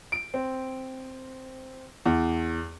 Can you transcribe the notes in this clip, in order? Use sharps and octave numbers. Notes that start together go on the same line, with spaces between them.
D7
C4
E2